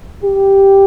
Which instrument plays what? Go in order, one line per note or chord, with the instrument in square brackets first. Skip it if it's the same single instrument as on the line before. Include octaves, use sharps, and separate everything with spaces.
[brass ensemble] G4